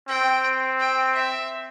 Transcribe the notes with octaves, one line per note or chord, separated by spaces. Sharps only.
C4 G5
G5
E5